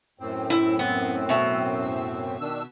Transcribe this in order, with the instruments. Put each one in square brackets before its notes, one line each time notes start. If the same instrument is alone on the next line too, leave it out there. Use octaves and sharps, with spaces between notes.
[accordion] F#2 A2 C4
[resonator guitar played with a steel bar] E4
B3
B2 E5
[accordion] D#3 D4 E6